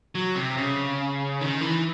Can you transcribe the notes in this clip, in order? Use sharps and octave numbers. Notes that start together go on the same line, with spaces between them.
F#3
C3
C#3
D#3
E3